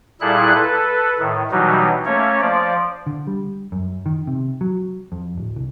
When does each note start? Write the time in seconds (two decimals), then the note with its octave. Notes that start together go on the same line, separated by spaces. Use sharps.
0.21 A#2 G3 E4 G#4 A4 F#6
0.55 A4 B4
1.19 A2 D#3
1.51 B2 E3 F#3 G3 D#4
2.06 A3 A#3 C#4 C#5
2.41 F3 D5
3.07 D3
3.27 G3
3.72 F#2
4.06 D#3
4.27 C3
4.61 F#3
5.12 F2
5.38 D1
5.56 C2